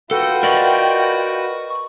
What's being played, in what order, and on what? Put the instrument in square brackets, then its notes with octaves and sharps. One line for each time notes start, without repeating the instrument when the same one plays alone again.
[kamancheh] F4 G5 [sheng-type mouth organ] F#4 B4 F#5 [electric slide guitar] A4
[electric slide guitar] A#4 D5 D#5 [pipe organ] C#6